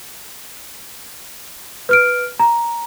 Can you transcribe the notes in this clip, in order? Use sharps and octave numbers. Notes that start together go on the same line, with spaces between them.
B4 F6 D7
A#5